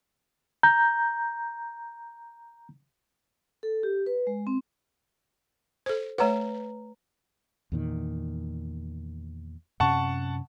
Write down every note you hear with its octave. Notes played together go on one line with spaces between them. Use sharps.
A#5 G6
A4
G4
B4
G#3
C4
A4 C5
A3 B4 C#5 F#5 A#5
E2 A#2 D#3
F#2 C3 C#4 F#5 A5 C#6